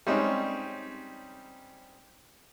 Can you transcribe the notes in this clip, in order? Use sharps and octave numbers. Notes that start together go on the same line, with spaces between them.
G3 G#3 C4 C#4 D#4